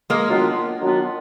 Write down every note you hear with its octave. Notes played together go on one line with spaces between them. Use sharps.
G#3 A#3
D#3 F#3 B3 D4 F4
D#3 F#3 B3 D4 F4